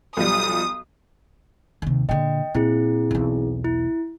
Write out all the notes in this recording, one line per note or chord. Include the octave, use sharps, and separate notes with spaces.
B1 F3 G3 D#6
D#2 C3
A#2 D3 D#5 G5
A#2 C4 E4 G#4
B1 E2
E4